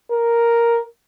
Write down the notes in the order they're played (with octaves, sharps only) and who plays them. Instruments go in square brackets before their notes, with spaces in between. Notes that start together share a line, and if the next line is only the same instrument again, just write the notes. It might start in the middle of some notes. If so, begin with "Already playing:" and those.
[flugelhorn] A#4